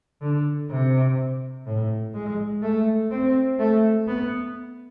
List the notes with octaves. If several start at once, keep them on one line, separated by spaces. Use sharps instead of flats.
D3
C3
A2
G#3
A3
C4
A3
B3